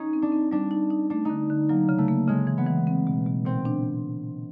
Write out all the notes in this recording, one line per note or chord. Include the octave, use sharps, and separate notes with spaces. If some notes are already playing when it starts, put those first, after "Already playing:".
Already playing: C#4 D#4
C4
D4
C4
G3 D4
D#4
D#4
A3 D4
D3 D#4
D3
F#3 A#3
C#3
A3
A#3
C#3 G#3
E3
B3
E3
C4
B2
B2
A#2 C4
D4